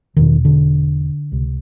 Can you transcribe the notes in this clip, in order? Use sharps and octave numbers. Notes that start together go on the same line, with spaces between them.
E1 E2 B2 D#3
D3
C#2 C3